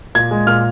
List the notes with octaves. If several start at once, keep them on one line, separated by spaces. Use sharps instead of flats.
A#2 G#6
G#3
A#2 F6